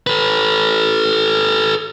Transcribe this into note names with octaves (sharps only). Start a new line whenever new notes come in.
A4 B4